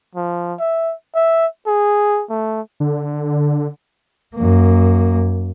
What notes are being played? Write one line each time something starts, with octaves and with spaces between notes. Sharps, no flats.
F3
E5
E5
G#4
A3
D3
F#2 A#3